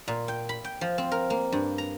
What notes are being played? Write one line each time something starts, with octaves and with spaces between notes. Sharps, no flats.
A#2
G5
B5
G5
F3
C4
A#4
A#3
G2
A#5